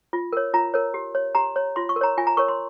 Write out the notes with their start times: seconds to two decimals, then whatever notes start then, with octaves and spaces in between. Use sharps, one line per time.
0.13 F4
0.33 A#4 C#5
0.54 F4 A#5
0.74 A#4 C#5
0.94 G4
1.15 C#5
1.35 G4 A#5
1.56 C#5
1.76 F4 C6
1.89 C#6
1.96 A#4
2.01 C#5 A#5
2.17 F4 G#5
2.27 A#5
2.37 A#4 C#5 C#6
2.48 C6